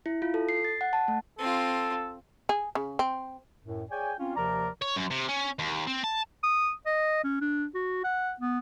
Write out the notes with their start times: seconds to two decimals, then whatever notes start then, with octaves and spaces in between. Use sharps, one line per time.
0.06 E4
0.22 F4
0.34 A4
0.49 C7
0.65 A6
0.81 F#5
0.93 A5
1.08 A3
1.38 C4 F4 A4
2.49 G#4
2.75 C#3
2.99 C4
3.64 F#2 A2
3.91 G#4 C#5 D5 G5 G#5
4.19 C4 C#4 F4
4.36 D#2 C3 F3 A#4 D5 A#5
4.82 C#5
4.96 F#2
5.11 C3
5.29 C#4
5.59 D#2
5.87 C4
6.04 A5
6.44 D#6
6.86 D#5
7.24 C#4
7.41 D4
7.75 F#4
8.04 F#5
8.40 B3